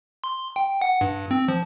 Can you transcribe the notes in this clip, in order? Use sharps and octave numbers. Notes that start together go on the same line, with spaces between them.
C6
G5
F#5
G2
C4
F3